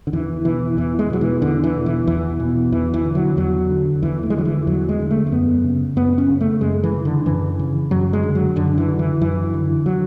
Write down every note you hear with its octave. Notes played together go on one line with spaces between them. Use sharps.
D3
E2 E3
B2 E3
E2 E3
G#3
B2 F#3
E3
E2 D3
E3
B2
E3
E2 E3
B2
E2 E3
E3
D3
F#3
E2 F#3
D3
E2 E3
A3
G#3
D3 F#3
E3
E2 F#3
G#3
D3
A3
A3
F#2 B3
C#3
F#2 B3
C#4
C#3
A3
F#2 G#3
E3
C#3
D3
F#2 E3
C#3
F#2 F#3
G#3
D3
F#3
F#2 D3
E3
D3
E3
F#2 E3
D3
F#3